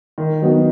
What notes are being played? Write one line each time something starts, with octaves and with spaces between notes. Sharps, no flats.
D#3
F#3 B3 D#4